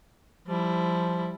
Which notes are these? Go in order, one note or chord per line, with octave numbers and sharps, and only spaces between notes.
F3 G3 E4